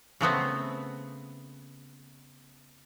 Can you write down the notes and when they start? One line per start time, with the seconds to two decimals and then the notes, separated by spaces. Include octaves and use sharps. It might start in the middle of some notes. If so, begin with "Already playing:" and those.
0.21 C#3 A3 B3 C4